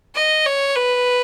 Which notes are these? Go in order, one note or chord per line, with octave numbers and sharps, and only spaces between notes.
D#5
C#5
B4